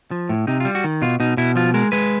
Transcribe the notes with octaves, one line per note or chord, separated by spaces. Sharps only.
F3
A2
C3 D#4
F4
G3
F#4
D#3
B2 F4
B2 D#4
B2 E4
F3 F4
G#3 A#4
G#3 B4